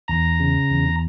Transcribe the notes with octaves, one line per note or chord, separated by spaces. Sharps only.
E2 A#5
C#3
E2